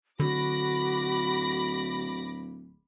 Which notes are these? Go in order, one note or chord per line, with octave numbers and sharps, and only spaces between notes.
D1 D3 F#4 B5 D6 A#6